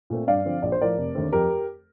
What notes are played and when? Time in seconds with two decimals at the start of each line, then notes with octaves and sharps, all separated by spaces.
0.10 A#2 A3 C4
0.27 G2 D5 F5
0.45 D3 F3 C4
0.62 A#1 D5
0.72 C5
0.80 A2 F3 A#4 D5
0.98 F1
1.15 D#2 D3 A3 C4
1.32 F2 G4 A#4